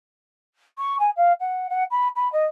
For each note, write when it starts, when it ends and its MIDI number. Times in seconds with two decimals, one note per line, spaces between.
0.78 0.99 85
0.99 1.10 80
1.17 1.33 77
1.40 1.67 78
1.70 1.84 78
1.91 2.08 83
2.16 2.31 83
2.32 2.46 75